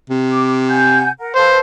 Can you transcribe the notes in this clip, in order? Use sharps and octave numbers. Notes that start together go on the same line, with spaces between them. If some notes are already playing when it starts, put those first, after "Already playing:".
C3
D6
F#5 G#5 G6
A#4 F#5
A4 B4 C5 F5